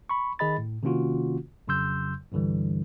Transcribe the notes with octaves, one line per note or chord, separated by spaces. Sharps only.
B5 C#6
D#3 G#4 D#5 B5 A6
A2
C3 D#3 A#3 C#4 F4 F#4
F2 C#3 F#3 C6 E6 G6
C2 G2 D3 E3 G3